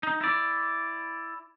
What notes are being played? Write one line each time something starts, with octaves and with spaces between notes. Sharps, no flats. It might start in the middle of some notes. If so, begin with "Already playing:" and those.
D#4
E4 D5